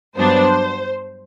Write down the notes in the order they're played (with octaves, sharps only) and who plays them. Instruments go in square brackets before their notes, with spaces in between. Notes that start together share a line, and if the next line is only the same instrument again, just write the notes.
[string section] G2 F#3 B3 D4 C5